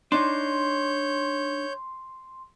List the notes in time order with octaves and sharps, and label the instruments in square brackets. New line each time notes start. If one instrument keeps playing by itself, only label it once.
[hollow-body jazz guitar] D4 D#4 [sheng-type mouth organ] C#5 G6 [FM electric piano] C6